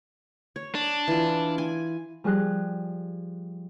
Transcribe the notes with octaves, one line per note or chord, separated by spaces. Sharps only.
C#5
D4
E3 F4
G#5
F3 G3 G#4 F#6